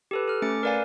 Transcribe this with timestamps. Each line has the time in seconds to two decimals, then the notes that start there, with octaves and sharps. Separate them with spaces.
0.11 G4 A4 B4
0.28 A4 F6
0.42 A3 C#4 D6 A6 C#7
0.63 A#4 B4 D5 F5 G#5